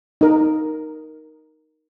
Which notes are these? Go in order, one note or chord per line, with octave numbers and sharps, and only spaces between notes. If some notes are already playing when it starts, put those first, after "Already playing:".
D#4 A#4